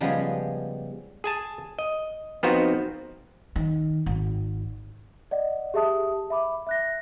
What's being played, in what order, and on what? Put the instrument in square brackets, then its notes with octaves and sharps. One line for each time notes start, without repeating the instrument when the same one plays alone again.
[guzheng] C#3 F3 G3 G#3 B3 C#4
[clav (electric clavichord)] G#4 G#5 A5
D#5
F3 B3 C4 D#4 F4 F#4
[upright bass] D#3
G#1
[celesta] D5 D#5 F#5
G4 G#4 E5 A5 D#6
E5 B5 D6
E5 F#6 A#6